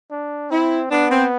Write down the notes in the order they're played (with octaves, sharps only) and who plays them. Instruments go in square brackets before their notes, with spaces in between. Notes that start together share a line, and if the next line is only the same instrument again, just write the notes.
[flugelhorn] D4
[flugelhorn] C4 [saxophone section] E4
[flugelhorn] B3 [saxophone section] D4
[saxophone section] C4